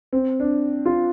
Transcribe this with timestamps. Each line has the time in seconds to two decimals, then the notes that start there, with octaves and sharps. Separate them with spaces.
0.13 C4
0.40 D4
0.86 F4